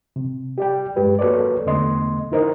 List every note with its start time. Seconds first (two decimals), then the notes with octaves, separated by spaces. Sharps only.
0.16 C3
0.58 G4 D5 G5
0.96 G2 G#3 G4 B4
1.19 A#3 F#4 A4 B4 C#5 D5
1.66 E2 D3 A3 B3 D#5 C6
2.32 D#4 E4 A#4 C5 D#5